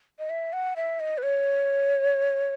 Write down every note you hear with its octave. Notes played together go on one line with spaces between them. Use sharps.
D#5
E5
F#5
E5
D#5
B4
C#5